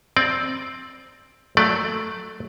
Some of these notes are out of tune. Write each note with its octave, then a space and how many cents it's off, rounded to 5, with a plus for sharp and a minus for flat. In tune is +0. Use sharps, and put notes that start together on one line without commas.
C4 +5 D5 +0
F#3 +0 A3 +0 D5 +15